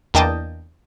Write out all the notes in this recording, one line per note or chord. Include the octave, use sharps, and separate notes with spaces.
E2 A#3 D4 D#5 G5 A5